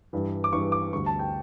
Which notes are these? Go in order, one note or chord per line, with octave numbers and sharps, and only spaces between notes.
G2 E3 G3
D6
G2 E3 G3 C#6
D6
D2 D3 G3 C#6
A5
G5